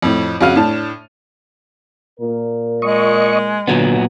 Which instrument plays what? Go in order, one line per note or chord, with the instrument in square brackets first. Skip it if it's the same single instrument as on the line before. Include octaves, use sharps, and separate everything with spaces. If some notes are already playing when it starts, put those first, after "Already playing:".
[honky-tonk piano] F2 A2
F2 C#3 F#4 F5 F6 D#7
A2 D4 A5
[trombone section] A#2 A#4
[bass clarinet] G#3 [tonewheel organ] D#5 C#6
[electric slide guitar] A#2 F#3 B3 [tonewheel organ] D3